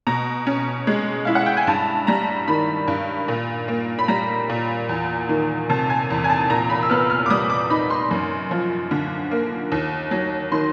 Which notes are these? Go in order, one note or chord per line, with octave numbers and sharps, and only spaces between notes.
B2 A#5
C#4
G#3
E4 F5
F#5
G5
G#5
G2 A5
G3 A#5
D#3 B5
G2
A#2
A#3
B5
G3 A#5
A#2
E2
D#3
C3 A5
G#5
E2
G#5
A5
A#2 A#5
B5
E6
B3 F6
F6
D6
G3 D#6
D6
D#4 B5
C6
F#2
F3
D3
A#3
D#2
F#3
D#3 C6